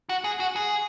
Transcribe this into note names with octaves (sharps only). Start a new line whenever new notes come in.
F#4
G#4
F#4
G#4